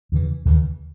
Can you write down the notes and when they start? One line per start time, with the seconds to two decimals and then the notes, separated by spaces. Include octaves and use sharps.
0.12 E2 C#3 E3
0.45 D#2 C#3 E3